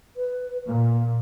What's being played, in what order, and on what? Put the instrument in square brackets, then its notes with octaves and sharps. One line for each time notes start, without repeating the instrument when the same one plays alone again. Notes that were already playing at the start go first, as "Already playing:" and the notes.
[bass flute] B4
[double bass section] A#2 [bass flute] A#3